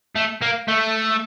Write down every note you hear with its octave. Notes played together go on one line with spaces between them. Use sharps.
A3
A#3
A3